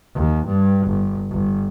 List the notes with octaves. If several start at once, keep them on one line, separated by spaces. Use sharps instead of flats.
D#2
G2
G1
G1